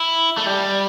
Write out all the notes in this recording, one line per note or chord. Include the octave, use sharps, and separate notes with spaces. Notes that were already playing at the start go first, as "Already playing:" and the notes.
Already playing: E4
A3
G3